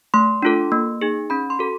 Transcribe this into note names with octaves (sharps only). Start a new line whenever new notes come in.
A3 C6
D4 F4 A4
A#3
D#4 G#4
C#4 B5
C6
F#4 A4